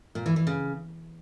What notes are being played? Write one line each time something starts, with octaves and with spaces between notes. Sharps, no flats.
A#2
E3
E3
C#3